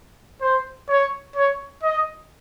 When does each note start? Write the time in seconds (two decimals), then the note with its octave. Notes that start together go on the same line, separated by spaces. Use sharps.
0.41 C5
0.89 C#5
1.36 C#5
1.83 D#5